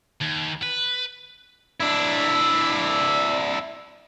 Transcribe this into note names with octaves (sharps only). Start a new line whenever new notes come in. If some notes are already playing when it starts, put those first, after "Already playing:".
D#2
B4
D4 E4